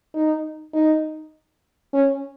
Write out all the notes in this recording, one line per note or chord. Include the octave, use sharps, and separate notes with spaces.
D#4
D#4
C#4